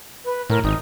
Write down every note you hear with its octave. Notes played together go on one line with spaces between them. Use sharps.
B4
A2 A#4
G#1 D#4